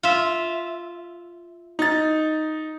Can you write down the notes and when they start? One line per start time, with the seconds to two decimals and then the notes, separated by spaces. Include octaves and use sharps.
0.03 F4 E5
1.79 D#4 A6